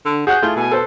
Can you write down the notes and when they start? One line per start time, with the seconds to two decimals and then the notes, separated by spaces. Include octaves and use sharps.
0.05 D3
0.27 F#4 G#4 F#5 F#6 G6
0.42 A3 E4 F4 G#4
0.56 B2 G#5
0.72 A4 B4 C5